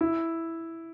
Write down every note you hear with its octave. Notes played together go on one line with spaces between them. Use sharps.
E4